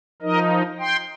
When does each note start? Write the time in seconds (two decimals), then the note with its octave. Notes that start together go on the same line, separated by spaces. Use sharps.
0.22 F3 D#4 A#4 D#5
0.79 G5 C6